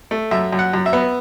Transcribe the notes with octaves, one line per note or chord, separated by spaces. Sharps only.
A3
F#2 E5
F#2
F#5
F#2
E5
B3